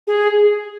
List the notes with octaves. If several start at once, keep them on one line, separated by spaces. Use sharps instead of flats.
G#4